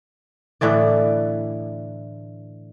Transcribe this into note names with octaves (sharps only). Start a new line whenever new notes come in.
A2 D3 E3 D5